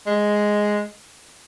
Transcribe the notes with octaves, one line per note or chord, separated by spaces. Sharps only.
G#3